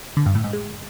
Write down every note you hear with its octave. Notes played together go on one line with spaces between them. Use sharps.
D3
G2
A2
G#2
G#3